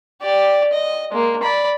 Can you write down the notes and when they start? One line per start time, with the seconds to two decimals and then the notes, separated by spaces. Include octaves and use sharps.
0.22 G4 D5
0.73 D#5
1.11 G#3 A#3
1.42 D5 B5